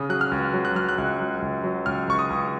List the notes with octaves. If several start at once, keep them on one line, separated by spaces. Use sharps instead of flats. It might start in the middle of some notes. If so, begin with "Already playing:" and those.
Already playing: C#3 D#6
F#3 F#6
F6
C#2
F#3
F#6
F#3 F6
F#6
C#2
F#3
C#2
F#3
C#2 F6
C#2 C#6
D#6
C#2